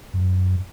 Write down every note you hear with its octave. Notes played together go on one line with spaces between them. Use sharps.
F#2